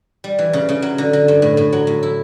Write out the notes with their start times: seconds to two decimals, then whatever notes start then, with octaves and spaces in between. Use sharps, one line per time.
0.24 G3
0.38 E3
0.53 C#3
0.69 C#3
0.82 F#3
0.98 D3
1.13 D3
1.28 G2
1.42 A2
1.57 A2
1.73 F#3
1.87 A2
2.03 E4